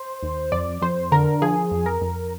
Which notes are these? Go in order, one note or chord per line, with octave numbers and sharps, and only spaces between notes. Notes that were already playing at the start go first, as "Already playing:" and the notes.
Already playing: C5
D#2
F2 D5
F2 C5
D3 A#4
F3 G#4
F2
A#4
F2